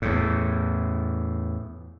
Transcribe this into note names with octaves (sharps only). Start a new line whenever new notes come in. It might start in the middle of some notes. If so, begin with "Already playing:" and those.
E2 A2